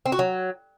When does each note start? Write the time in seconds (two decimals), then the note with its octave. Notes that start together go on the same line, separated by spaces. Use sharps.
0.06 C4
0.12 F#4
0.19 F#3